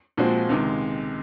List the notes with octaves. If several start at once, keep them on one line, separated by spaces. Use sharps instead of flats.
A#2 F3 G#3 C4 F#4
C#2 C3 D#3 G#3